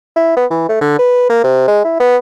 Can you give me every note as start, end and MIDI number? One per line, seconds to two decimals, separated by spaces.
0.16 0.36 64
0.36 0.46 59
0.51 0.68 52
0.69 0.80 57
0.81 0.95 50
0.99 1.28 71
1.29 1.41 58
1.44 1.65 48
1.68 1.82 56
1.85 1.96 64
2.00 2.17 59